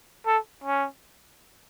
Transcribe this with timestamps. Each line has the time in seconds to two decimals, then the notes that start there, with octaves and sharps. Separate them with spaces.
0.27 A4
0.64 C#4